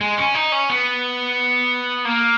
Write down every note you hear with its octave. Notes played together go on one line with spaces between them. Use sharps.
G#3
C#4
D#4
C#4
B3
A#3